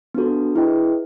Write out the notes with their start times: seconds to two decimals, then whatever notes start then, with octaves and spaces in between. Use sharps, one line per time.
0.14 B3 D4 F#4 A4
0.56 E4 G#4 B4 D#5 G5